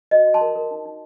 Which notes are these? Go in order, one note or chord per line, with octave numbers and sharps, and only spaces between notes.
F#4 D#5
F#4
A5 C6
A#4
A#4
D#4
D#4